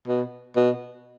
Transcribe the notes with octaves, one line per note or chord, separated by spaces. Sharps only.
B2
B2